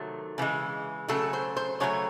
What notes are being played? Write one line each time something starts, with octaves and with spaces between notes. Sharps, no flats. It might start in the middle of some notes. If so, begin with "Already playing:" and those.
Already playing: C3 D#3 F#3 A3
C#3 E3 G#3
C#3 F#3 A3 A4
C5
C5
C#3 F#3 A3 C#5